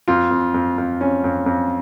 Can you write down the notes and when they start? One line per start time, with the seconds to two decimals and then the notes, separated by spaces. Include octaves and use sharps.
0.08 F2 F4
0.31 F2
0.54 F2
0.78 F2
1.01 F2 C#4
1.24 F2
1.46 F2